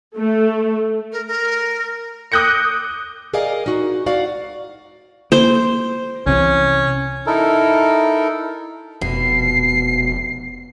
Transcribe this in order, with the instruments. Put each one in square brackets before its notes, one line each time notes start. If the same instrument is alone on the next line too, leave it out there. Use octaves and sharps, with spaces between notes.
[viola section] A3
[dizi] A#4
A#4
[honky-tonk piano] D6 D#6 F#6 G6 A#6 C#7
[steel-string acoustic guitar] G#4 A#4 D5 D#5 F5 G#5
D#4 F#4
F#4 D5 F5
[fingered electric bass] A#3 [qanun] C5
[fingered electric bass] C2 C3 E3 [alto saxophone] C#4
[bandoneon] D#4 E4 A4 A#4
[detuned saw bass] F1 [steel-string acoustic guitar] B2 [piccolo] C7